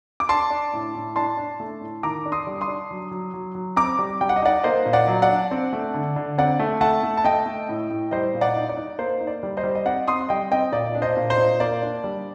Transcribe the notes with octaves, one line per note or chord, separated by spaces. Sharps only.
D6
D4 A5 C6
D4
A2
A2
D4 A5 C6
D4
A3
A2
D#3 A#5 D6
D4
C6 D#6
G3
C6 D#6
D4
F#3
F#3
F#3
F#3
C4 A#5 D6
G3
G3 G5
F#5
D#5
D#4 D5 F#5
A#3 C5 D#5
A#2
D5 F#5
F#3
D5 F#5
D4
C4
A3
D3
D3
C4 D5 F#5
A3
A3 F#5 A5
A3
A5
A3 D#5 G5
A3
A2
A2
G3 C5 D#5
A#2
D5 F#5
D#4
D5
D#4
A#3 C5
D#4
D5
G3
C5 D#5
G3
D#5
C4 D5 F#5
C4 C6 D#6
G3 D#5 G5
C4 D#5 G5
A#2 D5
D4
C5 D#5
A#2
C5
A#2
A#3 D5
D4
G3